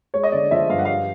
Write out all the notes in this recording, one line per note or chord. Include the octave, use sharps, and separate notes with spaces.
G#3 C#5
D#5
D3 D5
F3 E5
G2 F5
F#5
G3 F5